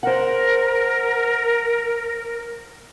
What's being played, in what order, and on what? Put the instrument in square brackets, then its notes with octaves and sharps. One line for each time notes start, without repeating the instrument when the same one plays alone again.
[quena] A#4 [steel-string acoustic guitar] C5 F#5